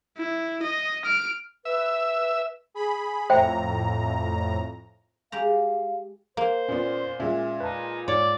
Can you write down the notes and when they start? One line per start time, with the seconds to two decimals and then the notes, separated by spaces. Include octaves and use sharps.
0.18 E4
0.63 D#5
1.05 F6 D7
1.65 B4 E5
2.74 G#4 B5
3.30 F2 A2 C5 E5 G5 A#5
5.32 G#3 G4 F5 A#5
6.37 A#3 C5
6.69 A#2 B3 C#4 D5
7.20 A#2 G#3 C#4 E5
7.60 D#4 B4 A5
8.08 G#2 C#5 D5